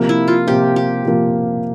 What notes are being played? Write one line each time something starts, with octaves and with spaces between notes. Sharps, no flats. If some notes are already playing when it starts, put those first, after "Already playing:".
Already playing: C3 F3 A#3
E4
F4
C3 F3 A#3 G4
G4
C3 F3 A#3